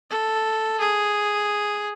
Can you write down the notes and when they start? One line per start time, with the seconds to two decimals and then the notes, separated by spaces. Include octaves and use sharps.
0.10 A4
0.80 G#4